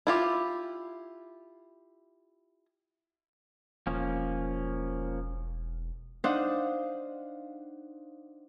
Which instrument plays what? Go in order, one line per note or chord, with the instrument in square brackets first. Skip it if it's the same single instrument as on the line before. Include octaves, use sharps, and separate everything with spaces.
[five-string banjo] E4 F4 G4
[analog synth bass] E1 [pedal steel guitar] F3 A#3 C#4
[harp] D4 D#4 C5 F5 F#5